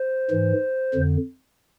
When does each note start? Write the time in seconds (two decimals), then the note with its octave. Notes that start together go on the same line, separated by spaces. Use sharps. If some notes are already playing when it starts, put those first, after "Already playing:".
Already playing: C5
0.31 G#2 E3
0.94 F2 D3